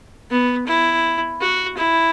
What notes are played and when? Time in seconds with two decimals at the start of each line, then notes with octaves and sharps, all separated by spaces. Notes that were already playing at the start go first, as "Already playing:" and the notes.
0.31 B3
0.67 E4
1.41 F#4
1.77 E4